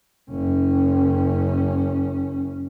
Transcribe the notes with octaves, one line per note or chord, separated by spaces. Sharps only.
F#1 C#4